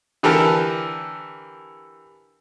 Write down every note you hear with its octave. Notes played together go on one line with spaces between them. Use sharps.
D3 E3 G4 A4 A#4